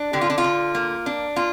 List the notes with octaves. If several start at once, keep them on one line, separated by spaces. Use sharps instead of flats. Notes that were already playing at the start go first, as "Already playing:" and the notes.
Already playing: D4
D3 G4
F4
D4
F4
D3
A#3
D4
A#3 F4